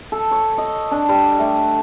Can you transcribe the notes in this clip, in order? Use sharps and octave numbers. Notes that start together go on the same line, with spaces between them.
A4
C#5
D#5
D4
G3
A3